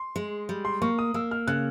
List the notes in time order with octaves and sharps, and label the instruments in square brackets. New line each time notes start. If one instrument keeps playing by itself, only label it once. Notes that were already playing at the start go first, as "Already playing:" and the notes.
Already playing: [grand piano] C6
[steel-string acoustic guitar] G#3
G3
[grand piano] C6
[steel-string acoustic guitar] A#3 [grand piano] C#6
[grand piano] D#6
[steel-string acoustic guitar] A#3 [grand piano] E6
[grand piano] F6
[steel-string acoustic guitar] C#3 [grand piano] F#6